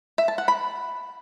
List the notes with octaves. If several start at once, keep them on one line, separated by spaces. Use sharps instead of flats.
E5
A5
F#5
B5